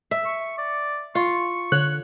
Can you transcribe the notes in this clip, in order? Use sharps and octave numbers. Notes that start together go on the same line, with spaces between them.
E5
C#6
D5
F4 C#6
D3 C#5 F#6